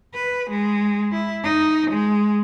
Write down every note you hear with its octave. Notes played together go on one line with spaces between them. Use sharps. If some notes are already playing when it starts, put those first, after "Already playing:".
B4
G#3
E4
D#4
G#3